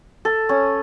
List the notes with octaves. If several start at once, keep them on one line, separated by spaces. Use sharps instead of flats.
A4
C#4